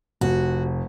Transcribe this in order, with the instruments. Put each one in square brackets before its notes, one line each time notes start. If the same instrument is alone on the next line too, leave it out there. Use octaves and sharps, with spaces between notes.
[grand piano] F1 [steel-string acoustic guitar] F#4